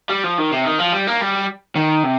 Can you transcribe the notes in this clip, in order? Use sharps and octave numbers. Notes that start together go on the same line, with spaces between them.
G3
F3
D#3
C3
D#3
F3
G3
A#3
G3
D#3
C3